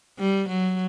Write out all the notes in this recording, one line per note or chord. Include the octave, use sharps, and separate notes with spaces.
G3
F#3